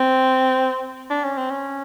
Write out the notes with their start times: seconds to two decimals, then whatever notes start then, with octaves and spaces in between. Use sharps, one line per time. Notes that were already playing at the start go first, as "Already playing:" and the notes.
Already playing: C4
1.10 D4
1.24 C#4
1.37 C4
1.51 C#4